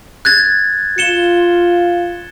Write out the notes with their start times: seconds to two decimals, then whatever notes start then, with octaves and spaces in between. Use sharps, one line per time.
0.25 F#6 G#6 A6
0.98 F4 C#7 E7 G7